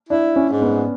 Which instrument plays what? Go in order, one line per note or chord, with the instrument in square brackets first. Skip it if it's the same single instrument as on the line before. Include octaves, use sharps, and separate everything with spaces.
[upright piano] D4 [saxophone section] E4
[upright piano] C#4
[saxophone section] G#2
[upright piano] B3